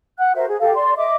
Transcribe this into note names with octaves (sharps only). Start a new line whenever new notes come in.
F#5 F#6
F#4 A#4 C5 E5
G#4
G4 A4 F5
D5 C6
D#5 E5 D6